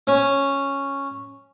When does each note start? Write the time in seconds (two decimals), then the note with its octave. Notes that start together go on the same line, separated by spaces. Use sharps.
0.07 C#4